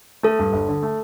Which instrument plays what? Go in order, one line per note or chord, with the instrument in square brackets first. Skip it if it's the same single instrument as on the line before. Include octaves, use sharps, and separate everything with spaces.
[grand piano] A3 [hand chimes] A4
[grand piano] G2
G1
D3
A3